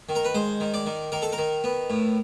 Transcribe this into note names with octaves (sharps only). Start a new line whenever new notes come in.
D#3
A#4
B4
G#3 C5
D#3
D5
D#3
D#3 A#4
A4
A#4
D#3
B3
A2